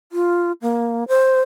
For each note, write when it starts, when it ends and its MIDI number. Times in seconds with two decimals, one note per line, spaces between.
0.12 0.52 65
0.62 1.04 58
1.08 1.41 72